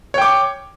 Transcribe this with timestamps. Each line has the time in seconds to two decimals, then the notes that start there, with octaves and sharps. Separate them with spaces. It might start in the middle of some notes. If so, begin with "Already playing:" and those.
0.14 C#5
0.18 G5
0.22 D6